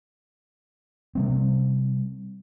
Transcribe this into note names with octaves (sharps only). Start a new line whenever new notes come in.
C3 G3 C4